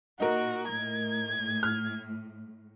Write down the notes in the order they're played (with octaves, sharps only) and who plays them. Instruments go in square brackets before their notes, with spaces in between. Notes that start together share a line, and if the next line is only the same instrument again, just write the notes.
[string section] A#2 [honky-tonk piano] D#4 A#4 [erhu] F#4
[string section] A2 [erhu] G#6
[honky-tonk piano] F6